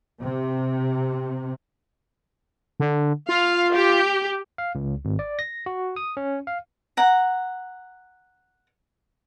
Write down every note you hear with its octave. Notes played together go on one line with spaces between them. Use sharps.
C3
D3
F4 F5
G4
F5
C#2
G#1
D5
A#6
F#4
D#6
C#4
F5
F#5 A#5